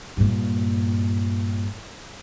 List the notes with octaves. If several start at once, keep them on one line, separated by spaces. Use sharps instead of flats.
G2 A#2